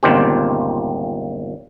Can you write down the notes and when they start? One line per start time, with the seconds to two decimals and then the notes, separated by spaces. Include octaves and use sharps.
0.03 G1 C#2 A#2 D#3 C4 G4